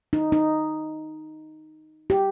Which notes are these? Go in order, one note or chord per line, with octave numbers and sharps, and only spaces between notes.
D#4
D#4
G4